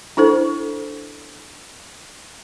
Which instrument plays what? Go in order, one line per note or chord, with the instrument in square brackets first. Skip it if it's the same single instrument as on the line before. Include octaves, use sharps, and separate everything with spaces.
[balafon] D4 E4 A4 C5